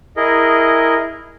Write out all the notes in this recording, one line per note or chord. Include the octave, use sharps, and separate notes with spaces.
E4 G#4 A#4 D#5